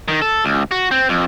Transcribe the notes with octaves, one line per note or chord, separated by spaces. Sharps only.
D#3
A4
C#2
F#4
C4
F2